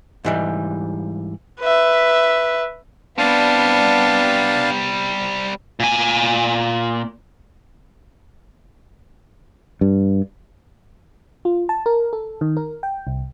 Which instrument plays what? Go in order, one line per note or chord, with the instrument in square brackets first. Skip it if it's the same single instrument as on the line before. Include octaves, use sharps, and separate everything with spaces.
[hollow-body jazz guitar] G#2 E3 G3
[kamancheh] B4 E5
[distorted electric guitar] C3 G3 [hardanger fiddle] B3 [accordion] D4 F5 A5
[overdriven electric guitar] A#2 G#5
[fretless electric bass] G2
[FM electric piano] F4
A5
A#4
A4
D#3
A#4
G5
C2